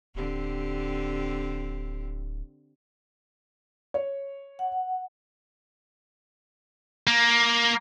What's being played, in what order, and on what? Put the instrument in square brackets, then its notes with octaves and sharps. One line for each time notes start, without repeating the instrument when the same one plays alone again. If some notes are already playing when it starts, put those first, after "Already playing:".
[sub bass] D1 [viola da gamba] D3 C4 G4
[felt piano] C#5
[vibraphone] F#5
[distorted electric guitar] A#3